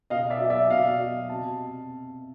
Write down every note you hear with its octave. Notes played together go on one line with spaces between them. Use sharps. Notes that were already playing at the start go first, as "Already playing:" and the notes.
B2 D#5 F5
D5 E5
F#3
D5 E5
B2 D#5 F5
F#3
C3 A5